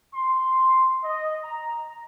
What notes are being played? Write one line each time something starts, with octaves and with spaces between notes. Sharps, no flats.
C6
D#5
A#5